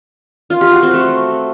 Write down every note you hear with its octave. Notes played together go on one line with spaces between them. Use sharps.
F4
G4
F#4
C4
A3